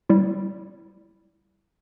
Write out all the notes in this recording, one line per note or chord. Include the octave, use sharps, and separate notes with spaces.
G3 E4